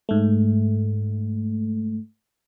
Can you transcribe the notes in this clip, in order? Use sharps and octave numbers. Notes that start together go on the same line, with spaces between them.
G#2 A3